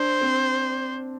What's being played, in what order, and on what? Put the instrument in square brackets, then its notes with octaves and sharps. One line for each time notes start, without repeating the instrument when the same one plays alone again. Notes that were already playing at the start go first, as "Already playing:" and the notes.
Already playing: [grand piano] D4 [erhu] C5
[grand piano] C4